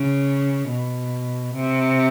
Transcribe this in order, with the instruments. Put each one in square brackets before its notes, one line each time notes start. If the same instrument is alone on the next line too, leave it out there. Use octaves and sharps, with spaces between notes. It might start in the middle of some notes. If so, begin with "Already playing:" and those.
Already playing: [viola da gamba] C#3
B2
C3